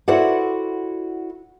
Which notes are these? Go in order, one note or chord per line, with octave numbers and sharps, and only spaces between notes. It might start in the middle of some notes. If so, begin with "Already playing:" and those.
E4 F#4 A4 C5 D5 F#5